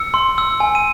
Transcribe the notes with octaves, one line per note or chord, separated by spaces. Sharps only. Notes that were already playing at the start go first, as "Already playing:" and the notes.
Already playing: E6 C#7
C6
E6
G#5
D#7